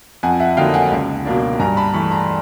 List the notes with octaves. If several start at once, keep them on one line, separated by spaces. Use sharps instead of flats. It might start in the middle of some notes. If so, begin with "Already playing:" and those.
F2 F#5 G#5
E5 F#5
D3 F#3 A#3 D#4 F5 G5
F#5 G#5
C#2
B2 F#3 A#3 D4
G2 G#5 A#5
A5 B5
E3 A3 B5 C#6
A#5 C6